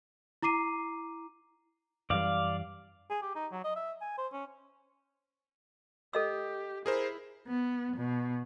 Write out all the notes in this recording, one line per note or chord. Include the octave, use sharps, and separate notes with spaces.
E4 A#5 D6 C7 D#7
F#2 E3 G3 D5 F5
G#4
G4
D#4
F#3
D#5
E5
G#5
C5
C#4
G4 A4 D#5 E6
E4 G#4 A#4 C5
B3
B2